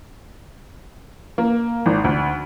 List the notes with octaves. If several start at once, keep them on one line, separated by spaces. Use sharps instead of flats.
A#3
G#1
D2